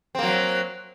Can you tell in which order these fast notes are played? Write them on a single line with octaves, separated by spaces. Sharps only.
C4 A#3 F#3